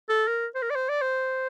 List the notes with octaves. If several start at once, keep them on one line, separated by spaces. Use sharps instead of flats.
A4
A#4
C5
A#4
D5
C5
D5
C5